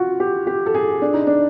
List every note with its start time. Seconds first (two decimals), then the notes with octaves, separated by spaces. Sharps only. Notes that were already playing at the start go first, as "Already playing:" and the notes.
Already playing: F4 F#4
0.20 G4
0.47 G4
0.66 A4
0.74 G#4
1.02 D4
1.14 D#4
1.27 D4